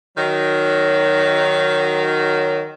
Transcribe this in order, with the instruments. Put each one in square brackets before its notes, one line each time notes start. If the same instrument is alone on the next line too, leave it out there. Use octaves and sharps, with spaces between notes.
[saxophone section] D#3 F#3